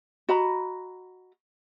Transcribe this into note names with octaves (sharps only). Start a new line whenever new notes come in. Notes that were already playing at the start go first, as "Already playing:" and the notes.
F#4 D#5 A#5 B5